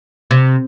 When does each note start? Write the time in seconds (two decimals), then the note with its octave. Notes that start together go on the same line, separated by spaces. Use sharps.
0.31 C3